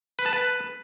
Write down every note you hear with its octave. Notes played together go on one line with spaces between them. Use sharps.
B4
A5
B4